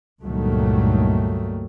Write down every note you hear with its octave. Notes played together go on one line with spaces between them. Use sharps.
C#2 G2 A#2 D#3 F#3 A3